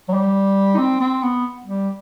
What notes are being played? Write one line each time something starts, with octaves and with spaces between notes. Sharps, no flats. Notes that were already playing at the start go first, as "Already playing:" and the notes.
F#3
G3
D#4
C4
C4
B3
G3